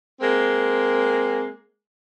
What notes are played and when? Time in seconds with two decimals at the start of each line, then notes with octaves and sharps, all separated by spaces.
0.21 G#3 A#3 C4